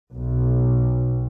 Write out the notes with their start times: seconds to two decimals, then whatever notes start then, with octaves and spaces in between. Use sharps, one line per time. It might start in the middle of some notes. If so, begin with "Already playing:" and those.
0.14 B1